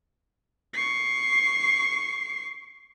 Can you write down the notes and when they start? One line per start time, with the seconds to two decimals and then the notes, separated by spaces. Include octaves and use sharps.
0.73 C#6 C7